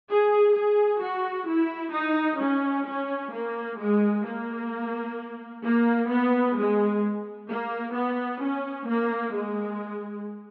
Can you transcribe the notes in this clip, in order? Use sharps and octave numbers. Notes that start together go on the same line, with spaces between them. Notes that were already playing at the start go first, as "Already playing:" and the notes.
G#4
G#4
F#4
E4
D#4
C#4
C#4
A#3
G#3
A#3
A#3
B3
G#3
A#3
B3
C#4
A#3
G#3